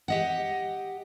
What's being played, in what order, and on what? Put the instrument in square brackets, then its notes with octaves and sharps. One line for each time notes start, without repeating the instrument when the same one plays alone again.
[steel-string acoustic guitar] G4 D#5 F#5